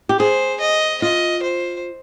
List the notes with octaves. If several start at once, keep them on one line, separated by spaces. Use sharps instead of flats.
G4
G#4 C5
D#5
F4 D#5
C5